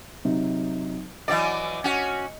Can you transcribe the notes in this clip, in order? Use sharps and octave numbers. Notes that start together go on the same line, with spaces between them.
C3 F#3 D#4
E3 F#3 D5 D#5
C#4 F#4